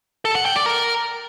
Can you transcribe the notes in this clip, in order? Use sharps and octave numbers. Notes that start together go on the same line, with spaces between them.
A4
F#5
G5
D5
A#4